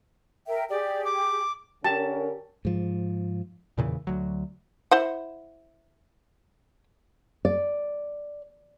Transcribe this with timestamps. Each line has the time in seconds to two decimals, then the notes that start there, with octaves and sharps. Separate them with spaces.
0.47 A#4 E5 G5
0.70 G4 G#4 D5 G5
1.05 D6
1.84 D3 C#4 G4 A#4 A5
2.65 G#2 F3
3.78 E2 A#2 C#3 E3
4.07 D2 F#3
4.91 E4 C5 F#5
7.45 D5